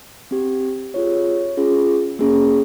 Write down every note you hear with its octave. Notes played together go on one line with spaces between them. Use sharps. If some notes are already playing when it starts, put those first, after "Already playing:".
C4 G4
C4 F4 G#4 C#5
C#4 F4 G#4
A#3 C#4 G#4